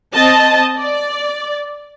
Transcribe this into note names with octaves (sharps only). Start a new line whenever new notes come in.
C4 D#5 A5
D5